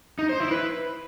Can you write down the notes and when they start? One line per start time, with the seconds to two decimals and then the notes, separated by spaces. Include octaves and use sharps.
0.19 D#4
0.29 C5
0.40 E4
0.51 B4